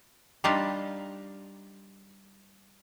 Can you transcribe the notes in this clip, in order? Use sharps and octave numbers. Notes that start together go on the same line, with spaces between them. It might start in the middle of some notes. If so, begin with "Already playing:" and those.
G3 D4 D#4 F4 G4 D#5